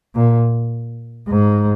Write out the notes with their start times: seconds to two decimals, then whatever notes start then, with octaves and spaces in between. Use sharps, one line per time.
0.15 A#2
1.27 G#2